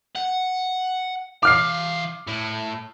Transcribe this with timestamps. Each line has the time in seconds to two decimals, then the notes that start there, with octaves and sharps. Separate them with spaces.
0.15 F#5
1.43 E3 F5 D6 F6 C7
2.27 A2